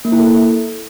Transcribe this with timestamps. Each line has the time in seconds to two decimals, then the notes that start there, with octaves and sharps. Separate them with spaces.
0.05 A#3
0.12 E4
0.20 A4